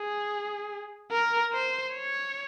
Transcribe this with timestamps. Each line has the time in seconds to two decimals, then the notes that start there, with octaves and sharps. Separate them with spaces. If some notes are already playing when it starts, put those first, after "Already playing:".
Already playing: G#4
1.12 A#4
1.53 C5
1.94 C#5